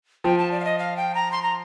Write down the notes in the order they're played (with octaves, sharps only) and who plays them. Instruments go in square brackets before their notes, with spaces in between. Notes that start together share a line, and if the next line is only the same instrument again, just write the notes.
[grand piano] F3 [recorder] G5
[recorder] A5
D5
F5
D#5
F5
G5
A#5
C6
A#5